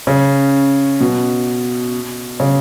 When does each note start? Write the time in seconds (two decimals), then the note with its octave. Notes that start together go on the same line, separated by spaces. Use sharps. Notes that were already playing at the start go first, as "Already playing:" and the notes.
0.07 C#3
1.00 B2
2.40 C#3